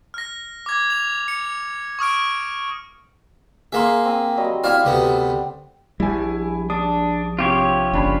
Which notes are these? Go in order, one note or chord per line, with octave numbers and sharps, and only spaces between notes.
F6 A#6
D6 G#6
F7
C#7
C#6 D#6 F6 D7
A#3 G#4 E5 C6
C4 D#6
F#3 G3 D#5
C4 E4 D5 F5
D2 C3 B3
A#1 G3 E4 G#5
D4 D#6
C3 F4 G4 C#5 G#6
F#1 C#4 D4 B5